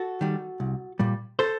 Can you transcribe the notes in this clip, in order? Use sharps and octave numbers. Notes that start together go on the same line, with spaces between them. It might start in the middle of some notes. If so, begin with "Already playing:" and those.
Already playing: F#4 A4
D#3 G3
C2
A#2 G3
A4 C5